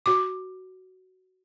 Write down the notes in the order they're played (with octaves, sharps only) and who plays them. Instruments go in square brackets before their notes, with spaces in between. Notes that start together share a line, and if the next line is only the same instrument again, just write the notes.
[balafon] F#4 D6